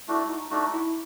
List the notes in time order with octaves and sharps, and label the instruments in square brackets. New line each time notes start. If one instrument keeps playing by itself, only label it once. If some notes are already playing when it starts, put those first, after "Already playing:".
[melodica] A3 D4 F#4 [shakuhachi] E4
[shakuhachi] D#4
[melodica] A3 D4 F#4 [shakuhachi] D#4
[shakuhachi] E4